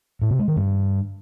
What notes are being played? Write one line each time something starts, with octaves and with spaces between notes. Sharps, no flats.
A2
C3
G#3
D#3
G2